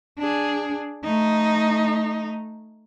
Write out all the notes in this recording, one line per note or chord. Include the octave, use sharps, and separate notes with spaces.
D4 G#4
A3 D#4